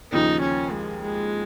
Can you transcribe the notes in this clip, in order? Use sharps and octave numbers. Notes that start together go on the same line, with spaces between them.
D#2 C#3 F3 D#4
C#4
G#3
G#3